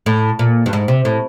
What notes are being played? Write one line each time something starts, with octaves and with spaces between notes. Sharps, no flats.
A2
A#2
G2
G#2
C3
A2